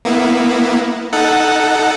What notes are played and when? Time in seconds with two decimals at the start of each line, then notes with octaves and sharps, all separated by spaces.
0.05 A#3 B3 E4
1.13 D#4 A4 F#5